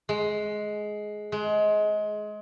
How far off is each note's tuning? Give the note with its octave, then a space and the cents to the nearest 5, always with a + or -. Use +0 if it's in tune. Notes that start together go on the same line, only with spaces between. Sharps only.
G#3 +15
G#3 +25